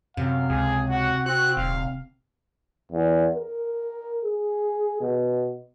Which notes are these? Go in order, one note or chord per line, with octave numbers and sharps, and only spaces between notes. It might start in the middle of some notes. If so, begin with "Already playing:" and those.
F#2 C3 F5
C#2 G#4
F#4 F#5
C4 F#4 F#6
D#1 F5
E2
A#4
G#4
B2